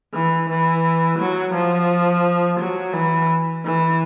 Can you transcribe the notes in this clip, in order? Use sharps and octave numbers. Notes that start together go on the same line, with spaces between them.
E3
E3
F#3
F3
F#3
E3
E3